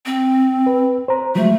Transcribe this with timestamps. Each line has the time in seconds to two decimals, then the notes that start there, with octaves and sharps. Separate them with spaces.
0.06 C4
0.66 B4
1.08 C5 A#5
1.35 F3 F#3 G#3 A3